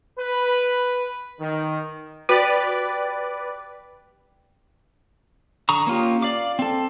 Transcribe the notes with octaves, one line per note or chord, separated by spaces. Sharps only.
B4
D#3
F#4 G4 B4 D5
D3 A#5 C#6 D#6
A#3 C#4 F4 G4
D5 F5 D6
C4 A4